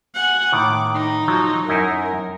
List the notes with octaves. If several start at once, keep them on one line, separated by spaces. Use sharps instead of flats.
F#5 G#5
A2 D#3 D6
D#4
F3 F#3
F#2 D#4 E4 A#4